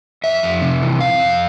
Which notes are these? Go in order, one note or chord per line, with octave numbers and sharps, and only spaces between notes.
F2 E5
F2
C3
E3
F2 F5
F2